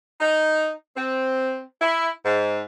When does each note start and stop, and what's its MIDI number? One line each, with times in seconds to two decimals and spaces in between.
0.21 0.71 63
0.97 1.61 60
1.81 2.09 64
2.24 2.62 44